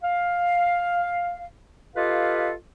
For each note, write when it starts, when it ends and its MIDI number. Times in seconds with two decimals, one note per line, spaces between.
0.04 1.45 77
1.96 2.52 65
1.96 2.52 67
1.96 2.52 69
1.96 2.52 71
1.96 2.52 75
1.96 2.52 77